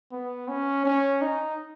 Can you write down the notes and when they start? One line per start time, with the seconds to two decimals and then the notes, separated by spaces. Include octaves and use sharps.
0.12 B3
0.48 C#4
0.85 C#4
1.22 D#4